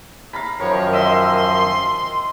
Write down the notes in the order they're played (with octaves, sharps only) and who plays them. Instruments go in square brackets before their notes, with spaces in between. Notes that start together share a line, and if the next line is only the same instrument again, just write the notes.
[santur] F5 A#5 B5
[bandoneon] F#2 D#3 F3 [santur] A#4 [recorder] C#5
[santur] D#5 E5 [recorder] C6